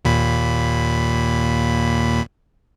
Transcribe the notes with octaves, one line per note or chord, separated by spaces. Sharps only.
D#2 A#2 B5